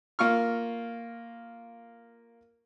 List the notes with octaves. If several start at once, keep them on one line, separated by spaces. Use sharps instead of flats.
A#3 F4 C#6 F6